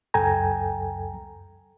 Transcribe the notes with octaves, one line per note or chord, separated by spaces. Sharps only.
C#2 F#2 A4 G5 G#5 A#5